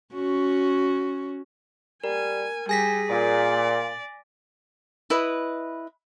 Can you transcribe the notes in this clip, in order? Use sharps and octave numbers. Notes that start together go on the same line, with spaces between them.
C#4 F#4
G3 A#4 G#5
G3 G#4 G#5 A#6 B6
A#2 D5
E4 B4 D#5